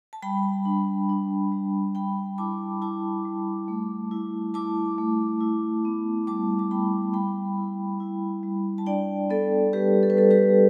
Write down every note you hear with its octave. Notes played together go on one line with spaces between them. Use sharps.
A5
G3 G5 B5
D4
D4
G3
G3 G5 B5
E4 A5 D6
E4 A5 D6
G3
A3
E4
E4 A5 D6
A3
E4
B3
G3 A5 D6
A5
G3 G5 B5
G3 G5 B5
E4
E4
G3
A5
D4 D5 G5
B3 A4 D5
G3 G4 B4
A4
B4
G3 A4
G4 B4